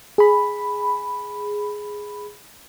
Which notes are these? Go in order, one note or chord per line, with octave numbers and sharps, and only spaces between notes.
G#4 B5